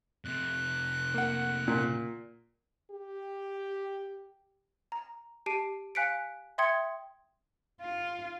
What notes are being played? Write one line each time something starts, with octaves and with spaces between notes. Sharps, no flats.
F2 C3 F#6
A#3 F#5
A#2
G4
A#5
G4 A5 C7 D7 D#7
F5 G#5 F#6 B6 C#7 D7
E5 G5 C6 D#6 G#6 C#7
F4